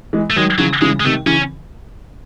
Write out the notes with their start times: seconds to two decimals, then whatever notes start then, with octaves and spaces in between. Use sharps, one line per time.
0.13 E3 G#3
0.30 A3
0.36 D#3 F#3 G#3
0.58 C#3 E3 F#3
0.81 C#3 E3 G#3
1.00 G#3
1.04 C3 D#3 A3
1.26 C#3 E3 C#4